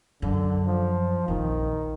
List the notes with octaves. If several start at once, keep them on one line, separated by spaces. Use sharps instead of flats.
F#2 D3
F3
A#1 F2 D#3